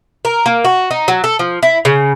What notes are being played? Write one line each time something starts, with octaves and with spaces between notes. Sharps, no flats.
A#4
A#3
F#4
D#4
F#3
A4
F3
E4
C#3